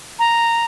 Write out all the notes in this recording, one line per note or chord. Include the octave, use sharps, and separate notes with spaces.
A#5